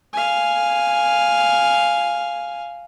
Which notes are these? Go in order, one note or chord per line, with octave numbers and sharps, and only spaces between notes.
F5 G#5